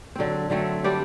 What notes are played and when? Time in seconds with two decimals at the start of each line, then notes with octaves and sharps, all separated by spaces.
0.16 D3 F#3 C4
0.50 D3 F#3 A3 C4
0.84 G3 D4 G4 D5